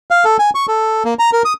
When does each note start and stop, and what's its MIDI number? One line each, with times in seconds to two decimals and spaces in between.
0.11 0.24 77
0.24 0.37 69
0.39 0.50 80
0.55 0.66 85
0.68 1.03 69
1.05 1.14 58
1.19 1.30 82
1.33 1.43 70
1.45 1.53 87